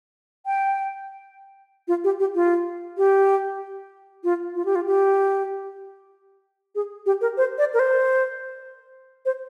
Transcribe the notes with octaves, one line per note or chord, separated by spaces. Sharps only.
G5
F4
G4
G4
F4
G4
F4
F4
G4
F4
G4
G#4
G4
A#4
C5
D5
A#4
C5
C5